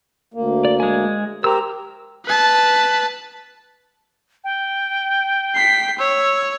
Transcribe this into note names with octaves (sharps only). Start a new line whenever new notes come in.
D2 A#3
D5
G#3 G#5
G4 A#4 C5 A#5 E6
B4 A5
G5
B6 C7
C#5 E6